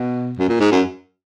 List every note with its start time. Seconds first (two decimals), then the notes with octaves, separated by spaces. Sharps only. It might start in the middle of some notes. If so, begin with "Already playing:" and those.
Already playing: B2
0.38 F#2
0.48 A#2
0.60 G#2
0.71 F#2